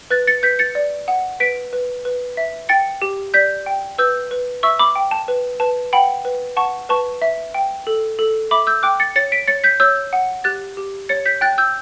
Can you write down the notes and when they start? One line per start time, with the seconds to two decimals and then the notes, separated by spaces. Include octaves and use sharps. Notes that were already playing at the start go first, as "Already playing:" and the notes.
0.10 B4 F#6 A6
0.27 A6 C#7
0.43 B4 G6 B6
0.59 A6 C#7
0.75 D5
1.08 F#5
1.40 B4 B6 D7
1.73 B4
2.05 B4
2.37 E5
2.69 G5 A6 C#7
3.02 G4
3.34 D5 G6 B6
3.66 G5
3.98 B4 E6 G6
4.31 B4
4.63 E5 C#6 E6
4.79 B5 D6
4.96 G5
5.11 A5
5.28 B4
5.60 B4 A5
5.93 F#5 G5 B5
6.25 B4
6.57 F#5 A5 C#6
6.89 B4 A5 C#6
7.22 E5
7.54 G5
7.87 A4
8.19 A4
8.51 E5 B5 D6
8.67 E6 G6
8.83 G5 D6 F#6
9.00 A6 C#7
9.16 C#5 A6 C#7
9.32 B6 D7
9.48 C#5 A6 C#7
9.64 G6 B6
9.80 C#5 E6 G6
10.13 F#5
10.44 G4 F#6 A6
10.77 G4
11.09 C#5 A6 C#7
11.26 G6 B6
11.41 G5 F#6 A6
11.58 E6 G6